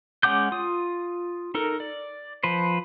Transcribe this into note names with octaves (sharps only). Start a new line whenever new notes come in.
G#3 C#4 F#5 D6 G6
F4 D#6
D#4 A4 A#4
D5
F3 B4 C5